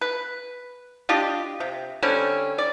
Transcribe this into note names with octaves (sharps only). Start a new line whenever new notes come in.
B4
D4 F4 G4 D#5
C3
D3 G3 C4 C#4
D5